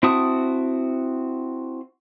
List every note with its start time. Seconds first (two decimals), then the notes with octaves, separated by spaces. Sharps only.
0.03 C4 E4 F#4 A5 D#6